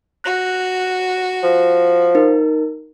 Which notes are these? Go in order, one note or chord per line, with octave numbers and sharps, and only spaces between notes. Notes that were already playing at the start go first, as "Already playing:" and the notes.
F#4 F#6 A#6
F3
D#4 A#4